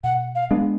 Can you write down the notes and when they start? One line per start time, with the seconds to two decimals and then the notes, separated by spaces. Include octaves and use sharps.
0.03 B2 F#5
0.35 F5
0.51 G#3 B3 D4